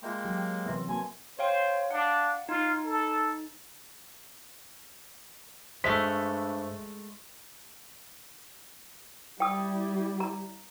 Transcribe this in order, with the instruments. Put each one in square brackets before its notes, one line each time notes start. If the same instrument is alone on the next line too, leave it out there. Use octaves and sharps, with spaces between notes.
[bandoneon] G#3 A#3 [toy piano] F4 E5 C6 [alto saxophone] G5
[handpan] F#3 G4
[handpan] C3 B3 [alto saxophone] E3 [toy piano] A#4 E5 C6
[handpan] A#3 [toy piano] F#4 A5 C6 [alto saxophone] G#5
[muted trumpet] C5 [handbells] C#5 F5 G5
[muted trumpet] D4 [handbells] F5 F#5
[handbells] D#4 [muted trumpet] F4
[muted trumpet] A4
[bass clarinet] G2 [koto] G#3 A3 [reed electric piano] C5 E5 C#6 [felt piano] B6
[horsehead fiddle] G3 E4 [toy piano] G5 D#6
[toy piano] A#5